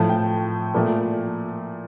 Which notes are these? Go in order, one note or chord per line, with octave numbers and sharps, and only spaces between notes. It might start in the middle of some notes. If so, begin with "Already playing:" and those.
Already playing: A2 F3 A3 A5
G5
A#2 F3 A3